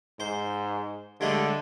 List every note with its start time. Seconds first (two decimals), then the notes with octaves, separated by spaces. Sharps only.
0.20 G#2 C5
1.21 G2 D3 G#3 A3